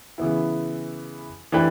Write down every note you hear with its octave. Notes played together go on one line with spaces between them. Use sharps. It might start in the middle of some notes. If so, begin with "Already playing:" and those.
C#3 E3 B3 E4
E3 A3 D4 G4 B4